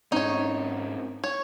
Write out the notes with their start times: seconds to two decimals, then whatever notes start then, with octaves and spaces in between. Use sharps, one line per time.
0.12 G#2 C4 C#4 D#4 C#5
1.24 C#5